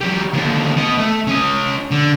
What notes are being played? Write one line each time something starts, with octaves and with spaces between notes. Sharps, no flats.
F#3 G4
D#2 D3
B3 D#5
A3
C#4 D#5
D3